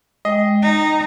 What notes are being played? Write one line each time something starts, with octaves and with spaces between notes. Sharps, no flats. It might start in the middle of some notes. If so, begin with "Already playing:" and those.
G#3 D#5 G5
D#4 G5